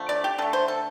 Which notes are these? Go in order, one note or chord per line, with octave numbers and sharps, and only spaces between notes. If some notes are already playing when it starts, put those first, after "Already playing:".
Already playing: D3 F3 A3
D5
G4
D3 A3 A4
C5
A4